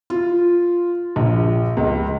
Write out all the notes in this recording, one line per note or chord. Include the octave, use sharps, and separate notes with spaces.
F4
A#1
C#2